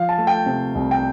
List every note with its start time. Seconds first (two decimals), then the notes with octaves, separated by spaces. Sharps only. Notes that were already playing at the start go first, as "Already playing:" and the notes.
Already playing: F3 F5
0.09 A5
0.18 A3
0.27 G5
0.46 C3
0.75 C2
0.91 G5